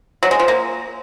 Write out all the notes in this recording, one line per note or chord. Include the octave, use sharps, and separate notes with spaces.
F#3
G#3
F3
A#3